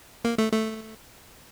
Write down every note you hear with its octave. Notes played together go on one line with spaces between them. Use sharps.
A#3
A3
A3